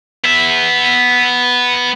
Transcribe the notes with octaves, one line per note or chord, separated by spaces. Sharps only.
B3 E5